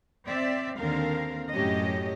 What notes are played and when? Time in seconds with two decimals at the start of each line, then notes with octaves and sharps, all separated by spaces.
0.25 C4 D5 E5
0.78 D#2 D3 C4 A#4 F5
1.52 F#2 A2 F#3 C#4 G4 D#5